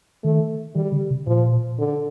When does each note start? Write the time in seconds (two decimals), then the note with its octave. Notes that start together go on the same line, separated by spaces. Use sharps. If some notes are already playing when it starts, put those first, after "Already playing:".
0.24 D#3 A3
0.75 D#3 G3
0.92 D3
1.10 C3
1.27 A#2 F3
1.78 D3